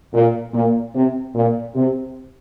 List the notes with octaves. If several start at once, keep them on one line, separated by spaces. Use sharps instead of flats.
A#2
A#2
C3
A#2
C3